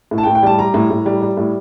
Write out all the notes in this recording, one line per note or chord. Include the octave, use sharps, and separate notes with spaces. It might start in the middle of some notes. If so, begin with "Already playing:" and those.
A2
A5
G5
A2
G5
G3 A5
G3 A#5
A2
A2
G3
G3
A2